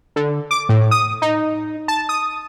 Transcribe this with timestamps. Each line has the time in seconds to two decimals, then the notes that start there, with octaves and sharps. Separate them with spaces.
0.16 D3
0.51 D6
0.69 A2
0.91 D#6
1.22 D#4
1.88 A5
2.09 D#6